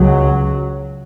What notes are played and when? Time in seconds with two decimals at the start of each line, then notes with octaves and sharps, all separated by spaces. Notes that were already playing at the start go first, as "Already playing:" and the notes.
Already playing: C#2 F#3